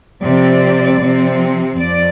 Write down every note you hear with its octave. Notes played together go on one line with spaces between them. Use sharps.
C3 F3 C4 D5
C3 F3 C4
F2 D5